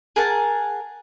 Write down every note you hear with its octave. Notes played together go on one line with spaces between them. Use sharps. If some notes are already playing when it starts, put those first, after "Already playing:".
G#4 A#4 F#5 A5